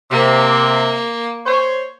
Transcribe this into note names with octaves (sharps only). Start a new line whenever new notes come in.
C3 A#3
C5 C#5